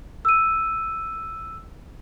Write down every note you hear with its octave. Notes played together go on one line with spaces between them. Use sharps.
E6 D#7